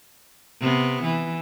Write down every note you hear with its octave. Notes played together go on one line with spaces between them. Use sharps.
C3 B3
E3